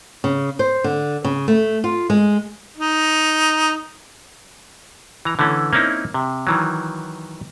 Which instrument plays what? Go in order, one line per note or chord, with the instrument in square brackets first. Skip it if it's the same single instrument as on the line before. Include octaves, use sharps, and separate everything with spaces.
[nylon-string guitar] C#3
C5
D3
C#3
A3
F4
G#3
[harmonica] D#4
[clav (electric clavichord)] E3 A#5
D3 E3 A3 C#4
A#3 C4 C#4 D#4 E4
C3
D#3 E3 F#3